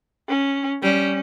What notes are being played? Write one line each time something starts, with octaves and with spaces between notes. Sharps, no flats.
C#4
G3 C#4